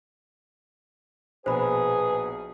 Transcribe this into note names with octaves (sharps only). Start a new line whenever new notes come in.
A#1 B2 G#4 B4 C5 B5